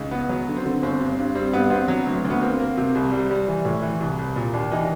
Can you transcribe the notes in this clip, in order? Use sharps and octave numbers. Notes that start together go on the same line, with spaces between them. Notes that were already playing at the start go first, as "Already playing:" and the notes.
Already playing: C#2 D#4
B3
F#3
D3
C4
D3
G1 C4
G2
G2
G3 C4
G2 B3
B3 C4
F#3
D2
D2
B3
A#3 C4
A#3
C3
C2
G3
G3
E3
A2
E3
C2
C2
A#2
D#2 D4
E3 D#4